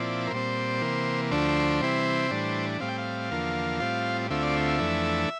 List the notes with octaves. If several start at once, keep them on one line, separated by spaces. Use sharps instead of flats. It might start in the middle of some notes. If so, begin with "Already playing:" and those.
Already playing: A#2 F3 C4 E4 D5
A#4
A#2 G3 C4 C5
C3 E3 A#3
D2 D3 F3 A3 D4 C5
C3 E3 G3 C4 E4
A2 E3 G3 D4
A2 G3 C4 F5
G5
F5
E2 D3 F3 A#3
A2 G3 C4 F4
D2 D3 A3 C4 F4 E5
D5
E5
F2 E3 A3 D4